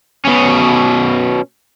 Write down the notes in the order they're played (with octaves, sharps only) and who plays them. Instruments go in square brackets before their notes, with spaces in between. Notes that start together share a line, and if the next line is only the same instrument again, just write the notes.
[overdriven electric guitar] B2 C#4